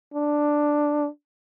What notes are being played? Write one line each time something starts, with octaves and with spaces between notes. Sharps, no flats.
D4